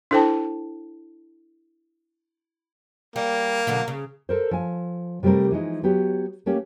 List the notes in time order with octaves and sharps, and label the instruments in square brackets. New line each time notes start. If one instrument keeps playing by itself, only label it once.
[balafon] D4 E4 A4 C5 G5 A5
[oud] G3 [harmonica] A#3
[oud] B2 D3 F#3
C#3
[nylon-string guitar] A4 A#4 C5
F3 G#5
C3 G3 A3 C4 A#4
E3 F3 G#3 D#4
F#3 B3 G4
A3 A#3 C#4 G4